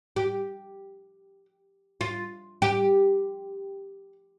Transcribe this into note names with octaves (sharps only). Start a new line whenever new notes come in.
G4
F4
G4